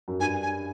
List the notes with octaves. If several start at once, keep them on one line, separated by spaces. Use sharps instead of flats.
F#2
G2 G#5
G#5